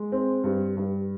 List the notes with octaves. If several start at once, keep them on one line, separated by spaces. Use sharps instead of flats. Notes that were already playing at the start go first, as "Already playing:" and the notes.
Already playing: G#3
C4
G2
G2